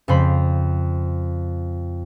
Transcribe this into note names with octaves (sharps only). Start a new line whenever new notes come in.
F2 C#3 C5 B5